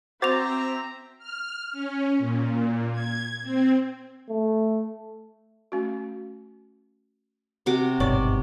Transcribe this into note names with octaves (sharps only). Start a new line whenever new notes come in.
C4 F#4 C5 E5 A#5 D6 A6 F7
F6
C#4
A#2
G#6
C4
A3
A3 C#4 F#4
C3 F#4 D6
G1 G#2 B2 C#5 D5 C#6